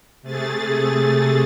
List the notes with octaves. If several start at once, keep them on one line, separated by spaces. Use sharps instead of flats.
C3 A3 G#4 A6